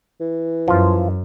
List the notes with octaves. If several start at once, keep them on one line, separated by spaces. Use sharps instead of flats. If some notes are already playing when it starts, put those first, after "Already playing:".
E3
F#2 F3 F4